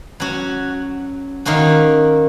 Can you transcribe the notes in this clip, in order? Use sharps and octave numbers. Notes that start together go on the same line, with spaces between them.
F#3 C#4 F#4
D#3 A#3 C#4 F#4